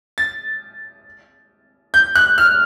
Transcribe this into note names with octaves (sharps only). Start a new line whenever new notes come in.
A6
G6
F#6
F6